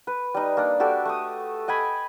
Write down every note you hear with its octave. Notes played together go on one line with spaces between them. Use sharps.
B4
G3 D#4
A#3 D4
F#4 G4 A4 D5
A3 D#6
D#5 G5 G#5 B5